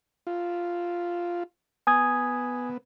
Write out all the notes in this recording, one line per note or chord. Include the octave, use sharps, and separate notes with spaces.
F4
B3 G#5 D#6 G#6